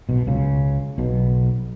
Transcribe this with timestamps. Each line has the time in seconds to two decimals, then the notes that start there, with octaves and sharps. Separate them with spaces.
0.09 B1 B2
0.27 C#2 C#3
0.98 B1 B2